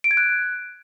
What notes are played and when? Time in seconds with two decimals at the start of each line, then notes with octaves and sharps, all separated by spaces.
0.04 D7
0.11 G#6
0.17 F#6